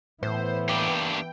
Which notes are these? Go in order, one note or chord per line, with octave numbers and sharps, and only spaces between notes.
A2 E3 B3 C5
A#3 D4 G4 G5